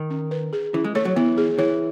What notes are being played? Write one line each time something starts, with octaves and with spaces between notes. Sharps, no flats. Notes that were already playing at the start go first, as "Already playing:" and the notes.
Already playing: D#3
C#4
B4
G#4
E3 C#4
G#3
A3 C#5
F#3
E3 B3
G#4
E3 C#5